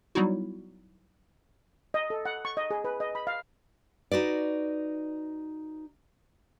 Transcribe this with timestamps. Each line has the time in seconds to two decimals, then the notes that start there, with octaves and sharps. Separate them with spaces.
0.15 F#3 G3 B3 D#4 E4 F#4
1.94 D#5
2.10 A4
2.25 F#5
2.45 C#6
2.57 D#5
2.71 G#4
2.84 B4
3.00 D#5
3.15 B5
3.27 F5
4.12 D#4 F#4 B4 D5